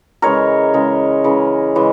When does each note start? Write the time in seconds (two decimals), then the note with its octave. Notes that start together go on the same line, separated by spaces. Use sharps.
0.22 C#3 E3 G#3 A#4 C#5
0.74 C#3 E3 G#3
1.24 C#3 E3 G#3
1.75 C#3 E3 G#3